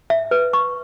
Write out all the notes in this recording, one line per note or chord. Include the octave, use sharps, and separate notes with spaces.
E5
B4
C#6